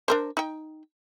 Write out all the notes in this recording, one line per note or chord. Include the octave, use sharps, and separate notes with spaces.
D4 A#4 C5
D#4 G5